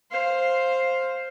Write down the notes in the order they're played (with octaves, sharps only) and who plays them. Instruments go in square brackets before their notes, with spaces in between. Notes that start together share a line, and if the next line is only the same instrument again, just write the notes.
[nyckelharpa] C5 F5